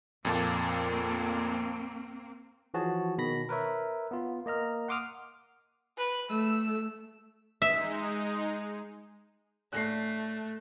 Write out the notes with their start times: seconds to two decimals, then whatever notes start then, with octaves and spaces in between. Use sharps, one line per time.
0.25 F2 A#2 A#3 C4 A5
2.74 E3 F3 F#4 G#4 C#5 A5
3.18 B2 D#3 B5 A#6
3.49 A#4 B4 C#5 E5
4.11 B3 F4
4.46 A#3 D#5 A#5 F6
4.88 F#5 C6 D6 D#6 F6
5.98 B4
6.30 A3 E6
7.62 G#3 D#4 E5
9.73 A2 A3 D4 F#6 A#6 C7